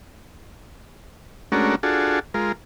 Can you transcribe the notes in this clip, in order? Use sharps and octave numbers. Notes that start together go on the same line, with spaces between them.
G#3 A3 C#4 D4 F#4 A#4
D4 F4 F#4 G#4 A4
G#3 F4 A#4